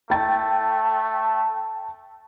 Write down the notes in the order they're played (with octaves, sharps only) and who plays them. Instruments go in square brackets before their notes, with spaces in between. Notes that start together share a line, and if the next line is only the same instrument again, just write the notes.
[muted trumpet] A3 [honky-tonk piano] G5 A6 [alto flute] A5